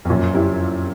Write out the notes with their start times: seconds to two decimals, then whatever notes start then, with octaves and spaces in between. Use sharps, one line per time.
0.05 F2
0.09 F#2 A#2
0.34 E4 G4